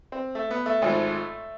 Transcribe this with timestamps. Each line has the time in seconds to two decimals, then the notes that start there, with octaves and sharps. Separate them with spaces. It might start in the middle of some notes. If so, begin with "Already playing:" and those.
0.12 C4
0.35 A3
0.51 B3
0.66 A3
0.82 G#1 G#2 F3